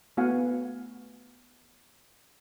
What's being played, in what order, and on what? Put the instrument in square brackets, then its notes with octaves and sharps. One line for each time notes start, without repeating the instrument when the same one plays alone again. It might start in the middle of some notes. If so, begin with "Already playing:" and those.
[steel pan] A3 B3 F#4 F5 F#5 G#5